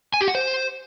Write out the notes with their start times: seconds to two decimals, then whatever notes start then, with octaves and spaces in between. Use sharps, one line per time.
0.14 G#5
0.21 G4
0.28 F#5
0.35 C5